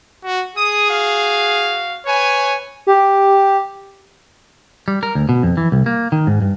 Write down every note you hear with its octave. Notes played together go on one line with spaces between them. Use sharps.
F#4
G#4 D#6
F#4 F5
B4 C#5 G#5
G4
G3
A#4
D2
B2
F2
E3
C2
A#3
D#3
G#2
G2